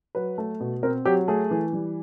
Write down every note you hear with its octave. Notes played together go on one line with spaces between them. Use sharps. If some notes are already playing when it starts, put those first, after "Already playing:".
F#3 B4
A3
B2
C4 A#4
F#3 G4
A3 G#4
E3
G3